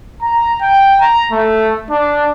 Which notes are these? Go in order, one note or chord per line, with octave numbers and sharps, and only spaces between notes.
A#5
G5
A#5
A3
D4